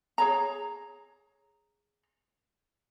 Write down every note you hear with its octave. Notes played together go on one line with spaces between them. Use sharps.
G#4 C#5 A#5